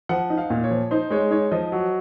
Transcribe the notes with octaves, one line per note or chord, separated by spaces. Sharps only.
F3 F#5
D#4
F5
A#2
C#5
F3
D#4 C5
G#3 C#5
D#4 C#5
F3 D#5
F#3